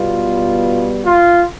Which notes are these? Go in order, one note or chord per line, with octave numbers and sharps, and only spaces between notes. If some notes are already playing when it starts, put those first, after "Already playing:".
Already playing: B2 G3 B3 F4
F4